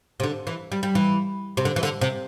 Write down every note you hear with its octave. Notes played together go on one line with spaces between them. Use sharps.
C3
D3
E3
G3
G3
E3
C3
D3
E3
D3
C3